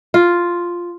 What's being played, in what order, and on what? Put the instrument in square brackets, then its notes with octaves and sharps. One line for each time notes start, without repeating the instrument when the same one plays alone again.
[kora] F4